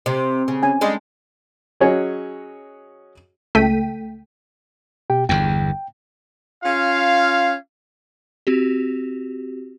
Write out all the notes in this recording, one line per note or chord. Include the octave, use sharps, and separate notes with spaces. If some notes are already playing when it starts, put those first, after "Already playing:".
C3
C#3
C#4 G#5
G3 G#3 D4
F#3 C#4 F#4 G#4 C#5 D#5
C#2 A3 A4 G5 B6 D#7
B2 G4 G5
G1 E2 G5
C#4 F4 F5
C4 F#4 G4